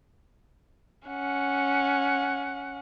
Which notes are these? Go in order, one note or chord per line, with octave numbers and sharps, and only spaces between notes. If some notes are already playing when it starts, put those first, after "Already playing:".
C#4 F#5